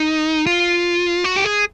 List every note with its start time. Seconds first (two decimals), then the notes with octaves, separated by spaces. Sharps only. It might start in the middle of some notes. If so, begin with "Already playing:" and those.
Already playing: D#4
0.46 F4
1.24 F#4
1.36 G4
1.44 G#4